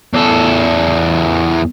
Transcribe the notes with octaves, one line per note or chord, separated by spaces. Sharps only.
E2 A4